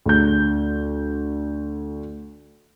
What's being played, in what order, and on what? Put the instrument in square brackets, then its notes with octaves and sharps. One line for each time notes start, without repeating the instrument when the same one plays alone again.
[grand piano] D2 G6